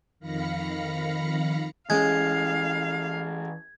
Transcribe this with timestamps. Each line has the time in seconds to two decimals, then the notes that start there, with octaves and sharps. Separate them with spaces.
0.20 F2 D#3 F5 B5 A#6 C#7
1.90 E3 G#3 C4 C#4 F5 G#6